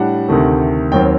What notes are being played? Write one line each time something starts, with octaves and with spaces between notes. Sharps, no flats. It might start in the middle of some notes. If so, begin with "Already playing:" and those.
Already playing: A2 G3 D4 F#5
D2 C3 D#3 A3
D#2 D#3 F#3 C4 G5